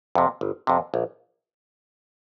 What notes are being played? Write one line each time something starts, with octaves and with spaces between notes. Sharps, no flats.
F2 C3
G1
F2 C3
A#1